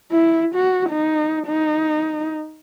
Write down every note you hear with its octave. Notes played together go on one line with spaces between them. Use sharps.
E4
F#4
D#4
D#4